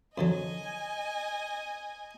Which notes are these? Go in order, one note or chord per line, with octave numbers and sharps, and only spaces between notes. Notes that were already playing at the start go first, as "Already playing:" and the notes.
F2 D3 F#3 D#5 G#5